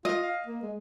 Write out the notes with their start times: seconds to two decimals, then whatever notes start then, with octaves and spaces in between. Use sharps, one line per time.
0.05 F4 D#5
0.23 F5
0.46 A#3
0.62 G#3